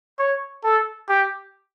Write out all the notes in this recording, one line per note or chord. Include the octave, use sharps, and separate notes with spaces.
C#5
A4
G4